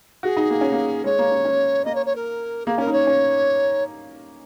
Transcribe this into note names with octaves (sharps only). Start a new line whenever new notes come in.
F#4 G#4
D#4
A#3
C#4
A#3
G#3 C#5
A#3
C#4
C#4
A#3 D#5
C#5
C#5
A#4
A#3 G#4
C#4 A#4
D#4
C#5
C#4